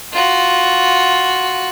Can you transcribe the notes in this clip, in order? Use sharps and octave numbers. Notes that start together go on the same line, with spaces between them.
F4 F#4